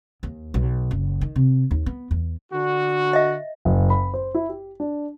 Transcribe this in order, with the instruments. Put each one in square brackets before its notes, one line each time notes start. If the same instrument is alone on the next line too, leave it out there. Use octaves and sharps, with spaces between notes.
[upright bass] D#2
B1
F#1
D#3
C3
D#2
B3
E2
[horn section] D3 F#4
[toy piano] D#5 E5
[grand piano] F#1
B5
C5
E4
G4
D4